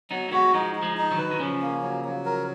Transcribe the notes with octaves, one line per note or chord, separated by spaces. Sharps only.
F#3 B3 D#4
A#3
G#3 B3 F#4
F3 G#3 D#4
D#4
F3 G#3
D#4
D#3 F#3
B4
D#3
C#3 F3 C#4
A#3
F#3
F#3
A#4